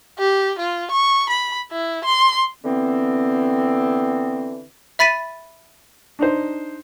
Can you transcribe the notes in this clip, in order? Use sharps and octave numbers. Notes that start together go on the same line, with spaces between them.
G4
F4
C#6
B5
E4
C6
D3 E3 B3 C4
E5 B5 A6 B6 D#7
D4 D#4 C5